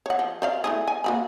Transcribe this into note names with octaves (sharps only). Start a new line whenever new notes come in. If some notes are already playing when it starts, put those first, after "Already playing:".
C#5 F#5
F3
C5 D5 F5
A3 E4 G#4
G#5
A#3 F#4 B5